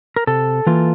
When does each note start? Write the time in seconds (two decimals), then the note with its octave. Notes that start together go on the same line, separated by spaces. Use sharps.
0.16 A#4
0.27 C3 A4
0.67 E3 A#3 F4